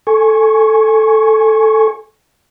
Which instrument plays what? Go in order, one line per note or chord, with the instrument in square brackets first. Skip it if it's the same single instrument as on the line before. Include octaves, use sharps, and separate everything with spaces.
[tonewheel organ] A4 G#5 C#6